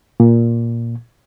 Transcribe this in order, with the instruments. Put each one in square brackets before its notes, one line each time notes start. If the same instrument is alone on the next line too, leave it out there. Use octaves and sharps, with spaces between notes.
[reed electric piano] A#2